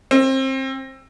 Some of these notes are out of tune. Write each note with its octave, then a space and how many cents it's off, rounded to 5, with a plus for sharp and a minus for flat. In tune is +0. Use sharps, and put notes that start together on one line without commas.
C4 +25